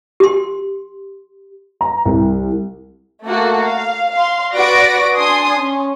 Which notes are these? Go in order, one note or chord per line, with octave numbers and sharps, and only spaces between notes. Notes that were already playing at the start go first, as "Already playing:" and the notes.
G4 C6
A#5
C2
A3 A#3 F#4 A4
F5
F5 C6
F#4 B4 D5 A#6 D7
D4 G#5 C6 D#6 C7
C#4